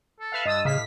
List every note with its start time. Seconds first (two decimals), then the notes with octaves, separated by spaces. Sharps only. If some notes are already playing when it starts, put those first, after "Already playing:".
0.20 A4
0.32 B4 E5 F5
0.45 G2 D#5 A5 D#6 E6
0.65 A2 C#3 F5 B6